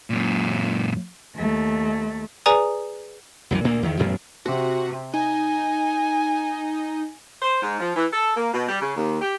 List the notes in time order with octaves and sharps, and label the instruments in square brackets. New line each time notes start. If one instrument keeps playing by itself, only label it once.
[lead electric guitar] F#2 A#2
[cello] D#2 A3
[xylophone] G#4 B4 D5 G#5 A#5 D#6
[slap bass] C2 F#2 C3 E3
D2 A#2 A#3
E2 D#3
A1 F#2 B2
[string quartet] C3 [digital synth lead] F#4
[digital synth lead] D#4 [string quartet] G#5
[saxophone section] C5
G#2
F3
E3
A4
A#3
B2
G3
C#3
D#2
G4